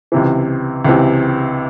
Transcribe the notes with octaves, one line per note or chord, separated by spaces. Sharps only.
C#2 C3 E3
C#2 C3 E3